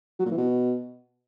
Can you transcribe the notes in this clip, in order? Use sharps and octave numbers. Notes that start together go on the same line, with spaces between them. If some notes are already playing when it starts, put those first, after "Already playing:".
F#3
A#2
E3
B2